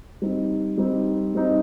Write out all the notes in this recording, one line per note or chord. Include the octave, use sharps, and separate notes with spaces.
G3 C4 D#4
G3 C4 D#4
G3 C4 D#4